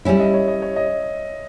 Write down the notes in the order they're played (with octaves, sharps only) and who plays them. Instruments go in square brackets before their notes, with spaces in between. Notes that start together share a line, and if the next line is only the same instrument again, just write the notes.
[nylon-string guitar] G3 C#4 E4 [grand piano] E5
[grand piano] D#5
C#5
D#5
C#5
D#5